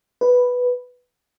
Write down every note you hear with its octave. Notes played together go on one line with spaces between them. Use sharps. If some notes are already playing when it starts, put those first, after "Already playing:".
B4